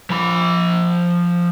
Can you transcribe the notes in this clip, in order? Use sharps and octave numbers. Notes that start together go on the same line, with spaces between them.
F3 B5